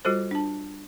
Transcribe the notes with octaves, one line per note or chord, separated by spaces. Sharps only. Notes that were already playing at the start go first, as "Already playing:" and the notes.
G3 F4 F#4 A4 C5
D4 A5